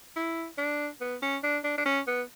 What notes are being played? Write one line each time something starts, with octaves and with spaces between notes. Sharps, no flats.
E4
D4
B3
C#4
D4
D4
D4
C#4
B3